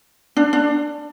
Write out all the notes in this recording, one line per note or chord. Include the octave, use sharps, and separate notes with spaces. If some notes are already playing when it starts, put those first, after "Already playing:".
D4
D4